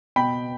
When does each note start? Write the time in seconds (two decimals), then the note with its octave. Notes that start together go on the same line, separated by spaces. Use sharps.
0.16 B2 G5 B5